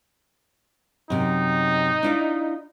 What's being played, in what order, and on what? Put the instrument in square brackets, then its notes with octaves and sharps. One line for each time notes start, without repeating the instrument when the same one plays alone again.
[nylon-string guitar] F#2 C3 [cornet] D#4
[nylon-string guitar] D4 E4 F4